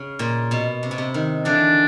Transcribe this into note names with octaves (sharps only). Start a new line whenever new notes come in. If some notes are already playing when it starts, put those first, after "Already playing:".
Already playing: C#3
A#2
B2
C3
B2
C3
D#3
D3 E3 D4